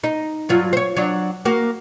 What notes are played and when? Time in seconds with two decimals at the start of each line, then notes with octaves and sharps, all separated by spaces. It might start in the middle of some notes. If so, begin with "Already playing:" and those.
0.04 D#4
0.49 G2 F#3 F4
0.73 C5 C#5
0.97 F#3 D4
1.45 A#3 F#4